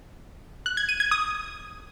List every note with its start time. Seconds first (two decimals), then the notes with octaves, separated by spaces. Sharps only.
0.66 F#6
0.77 G#6
0.89 D#7
1.00 G#6
1.11 D#6